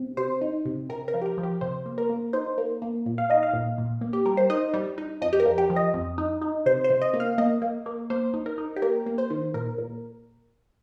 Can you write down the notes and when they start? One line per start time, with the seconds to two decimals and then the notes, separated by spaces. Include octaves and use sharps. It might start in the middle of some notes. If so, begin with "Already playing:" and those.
Already playing: C3
0.17 C3 C5
0.41 D#4
0.65 C3
0.90 C3 A#4
1.08 A#4
1.14 F3
1.21 G4
1.26 A#4
1.38 F3
1.43 G4
1.61 C3 C5
1.86 A#3
1.98 A#4
2.09 A#3
2.33 D#4 C5
2.58 A#3
2.82 A#3
3.06 A#2
3.18 F5
3.30 D#4 D#5
3.43 F5
3.53 A#2
3.78 A#2
4.01 A#3
4.13 G4
4.26 G3 A#4
4.37 C5
4.50 D#4 D#5
4.74 G3
4.98 D#4
5.22 F2 D#5
5.33 G4
5.40 A#4
5.45 F2
5.58 G4
5.70 F3
5.76 D#5
5.94 F2
6.18 D#4
6.42 D#4
6.66 C3 C5
6.84 C5
6.90 C3
7.02 D#5
7.14 A#3
7.20 F5
7.38 A#3 D#5
7.62 A#3
7.86 A#3
8.10 A#3 C5
8.34 D#4
8.46 A#4
8.58 D#4
8.76 G4
8.82 A#3 A#4
9.06 A#3
9.18 C5
9.30 D#3
9.54 A#2 A#4
9.78 A#2